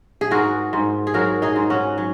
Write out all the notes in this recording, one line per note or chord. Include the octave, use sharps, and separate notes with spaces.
G#4
G#2 F#4 A#4
G#2
G#4
F#3 F#4 A#4
D#4 G#4
G#2
C#4 F#4
F#3